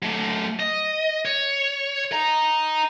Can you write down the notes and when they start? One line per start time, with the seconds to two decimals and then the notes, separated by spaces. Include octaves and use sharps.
0.03 F#3 A3
0.60 D#5
1.25 C#5
2.12 D#5 A#5